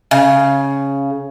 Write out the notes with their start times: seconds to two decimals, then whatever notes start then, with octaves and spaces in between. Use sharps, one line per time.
0.11 C#3